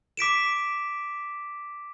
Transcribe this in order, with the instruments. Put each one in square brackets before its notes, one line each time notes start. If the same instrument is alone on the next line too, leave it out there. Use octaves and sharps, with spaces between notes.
[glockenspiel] D6 B6 D7 E7